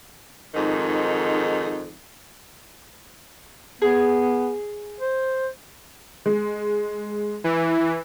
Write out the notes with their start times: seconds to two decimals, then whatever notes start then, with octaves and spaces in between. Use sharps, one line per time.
0.55 F2 G#2 D#3 D#4
3.82 B3 G#4
5.01 C5
6.26 G#3
7.44 E3